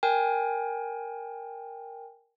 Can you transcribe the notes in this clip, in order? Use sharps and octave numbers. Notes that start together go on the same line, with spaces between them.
A#4 G5 G#5